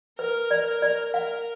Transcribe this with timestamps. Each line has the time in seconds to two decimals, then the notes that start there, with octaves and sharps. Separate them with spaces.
0.19 A#4 B4
0.51 D5
0.67 A#4
0.82 D5
1.14 A#4 F5